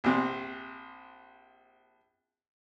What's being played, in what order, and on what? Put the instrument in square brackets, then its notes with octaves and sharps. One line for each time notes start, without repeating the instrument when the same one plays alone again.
[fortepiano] A#1 C3